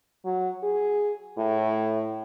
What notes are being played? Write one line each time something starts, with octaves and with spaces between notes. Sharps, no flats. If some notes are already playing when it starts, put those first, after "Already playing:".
F#3
G#4
A2